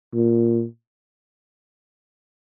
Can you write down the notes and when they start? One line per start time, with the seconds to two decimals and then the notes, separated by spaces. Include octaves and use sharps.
0.14 A#2